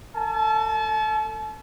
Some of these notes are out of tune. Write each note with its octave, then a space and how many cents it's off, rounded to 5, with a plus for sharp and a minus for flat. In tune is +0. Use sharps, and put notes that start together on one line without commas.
A4 +35 A5 -35